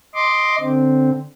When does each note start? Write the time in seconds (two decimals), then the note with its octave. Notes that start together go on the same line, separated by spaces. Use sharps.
0.15 D#5 C6 D6
0.60 D3 C4